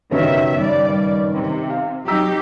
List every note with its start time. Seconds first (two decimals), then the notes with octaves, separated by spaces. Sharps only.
0.11 F#1 G2 B2 D#3 C#4 E5
0.59 D#3 G3 D5
1.35 C3
1.70 F5
2.08 F#3 D#4 G4 A#5 E6 B6